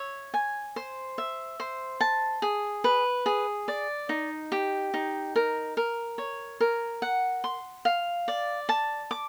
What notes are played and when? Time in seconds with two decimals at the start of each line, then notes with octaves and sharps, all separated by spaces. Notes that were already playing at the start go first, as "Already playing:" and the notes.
Already playing: C#5 E5
0.34 G#5
0.76 C5
1.18 E5
1.60 C5
2.01 A5
2.42 G#4
2.84 B4
3.26 G#4
3.68 D5
4.09 D#4
4.52 G4
4.94 D#4
5.36 A#4
5.77 A#4
6.18 C#5
6.61 A#4
7.02 F#5
7.44 C6
7.85 F5
8.28 D5
8.69 A5
9.11 D6